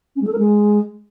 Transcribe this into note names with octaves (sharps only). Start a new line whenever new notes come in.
C#4
G#3
A4
A#4
G#3